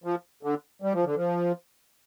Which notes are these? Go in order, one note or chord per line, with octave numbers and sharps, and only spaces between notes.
F3
D3
G3
F3
D3
F3